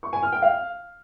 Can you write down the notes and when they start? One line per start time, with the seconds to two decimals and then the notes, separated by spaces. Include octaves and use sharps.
0.03 C#6
0.13 G#5
0.23 F6
0.32 G5
0.42 F5